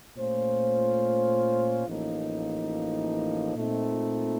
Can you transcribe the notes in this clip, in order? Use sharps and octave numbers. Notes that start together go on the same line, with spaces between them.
A#2 A3 C#4 F4 C5
A1 A2 F3 A#3 D#4
A#2 A3 C4 D#4